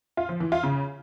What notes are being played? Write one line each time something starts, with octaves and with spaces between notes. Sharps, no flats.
F4
F3
E3
F4
C#3